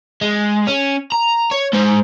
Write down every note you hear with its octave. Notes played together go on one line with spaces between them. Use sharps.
G#3
C#4
A#5
C#5
G#3 C5